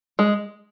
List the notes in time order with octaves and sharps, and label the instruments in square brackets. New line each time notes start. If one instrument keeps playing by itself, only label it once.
[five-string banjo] G#3